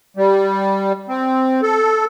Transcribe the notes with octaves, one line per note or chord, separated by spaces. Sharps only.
G3
C4
A4